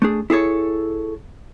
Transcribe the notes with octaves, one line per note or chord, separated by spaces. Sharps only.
A3 D4 G#4
E4 G#4 A4 C#5